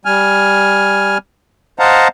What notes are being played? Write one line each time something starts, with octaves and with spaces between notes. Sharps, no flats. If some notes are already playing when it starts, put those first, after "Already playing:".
G3 G#5 F6
C5 D#5 F5 F#5 A5 A#5